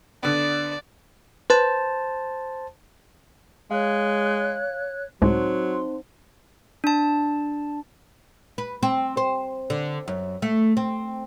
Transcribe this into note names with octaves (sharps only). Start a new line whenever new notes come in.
D3 B3 D5
B4 C5 A5
G#3 C#5 F5 F#6
C#2 A2 F#3 G#3 C4 D#4 C5 C6
D4 A5
B4
C4
C5
D3
F#2
A3
C4